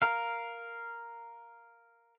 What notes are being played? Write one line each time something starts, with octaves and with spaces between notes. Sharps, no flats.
A#4 F5